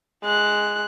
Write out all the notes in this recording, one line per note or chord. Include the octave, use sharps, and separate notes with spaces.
G#3 F#6